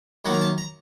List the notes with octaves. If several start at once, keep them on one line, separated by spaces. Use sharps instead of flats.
F#2 D#3 A#3 F#5
A#5
A5
A#5